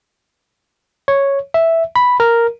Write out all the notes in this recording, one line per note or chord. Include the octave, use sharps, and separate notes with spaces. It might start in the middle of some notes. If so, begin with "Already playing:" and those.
C#5
E5
B5
A#4